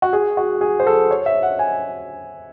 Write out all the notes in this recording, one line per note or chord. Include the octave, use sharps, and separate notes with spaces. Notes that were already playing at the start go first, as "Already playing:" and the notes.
F#4
G#4
F#4
G#4
C5
A4
C#5
E5
F#5
G#5